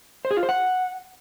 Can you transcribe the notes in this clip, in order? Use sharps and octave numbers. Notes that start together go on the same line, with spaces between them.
C5
G#4
F4
C5
F#5